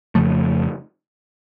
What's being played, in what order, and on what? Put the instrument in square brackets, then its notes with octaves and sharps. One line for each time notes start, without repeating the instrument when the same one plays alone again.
[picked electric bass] F2 C#3 F3 A3